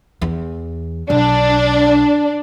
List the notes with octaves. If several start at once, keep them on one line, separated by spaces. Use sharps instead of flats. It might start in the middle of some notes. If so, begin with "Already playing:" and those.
E2
B1 D4